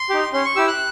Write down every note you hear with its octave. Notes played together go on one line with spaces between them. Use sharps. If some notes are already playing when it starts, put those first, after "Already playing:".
Already playing: C6
D#4 G4
C#4 C6
C#6
E4 G4 E6
F#6